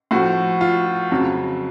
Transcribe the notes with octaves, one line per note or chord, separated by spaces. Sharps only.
A2 F3 F#4
F4
F2 C#3 F#3